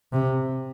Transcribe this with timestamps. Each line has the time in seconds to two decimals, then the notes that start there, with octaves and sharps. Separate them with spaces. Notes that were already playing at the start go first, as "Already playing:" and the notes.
0.13 C3